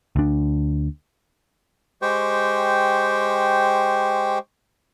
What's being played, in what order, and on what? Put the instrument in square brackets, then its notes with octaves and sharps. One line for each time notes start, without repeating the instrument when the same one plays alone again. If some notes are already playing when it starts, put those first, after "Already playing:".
[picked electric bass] D2 D4
[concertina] G#3 G4 C5 G5 C#6